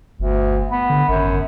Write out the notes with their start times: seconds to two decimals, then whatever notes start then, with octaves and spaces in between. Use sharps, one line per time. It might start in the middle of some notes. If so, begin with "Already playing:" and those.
0.20 G1 D2
0.71 B3
0.90 D3
1.08 G#1 F#2